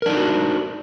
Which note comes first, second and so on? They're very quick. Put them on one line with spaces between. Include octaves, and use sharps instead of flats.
A#4 D4 D#4 F4 F#4